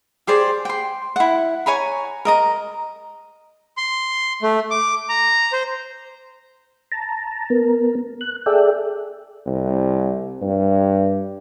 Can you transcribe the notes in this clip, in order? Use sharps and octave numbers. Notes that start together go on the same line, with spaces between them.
G4 G#4 C5 D5
G5 C6
E4 F#5
C#5 G#5 A#5 B5
A#4 D#5 A#5
C6
A3
D6
A#5
C5
A5 A#5
B3 A#4
F#6
G#4 A4 D5 E5 G5
C2
G2